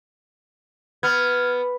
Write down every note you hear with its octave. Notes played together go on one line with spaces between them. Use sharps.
B3 F6 G#6